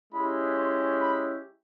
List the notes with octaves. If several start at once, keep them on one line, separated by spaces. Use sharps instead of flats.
G#3 C#4 E4 G4 B5
C6
B5